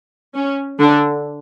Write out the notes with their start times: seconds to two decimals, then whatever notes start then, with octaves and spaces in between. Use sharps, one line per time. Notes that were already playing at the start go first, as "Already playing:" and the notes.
0.34 C#4
0.79 D3 D4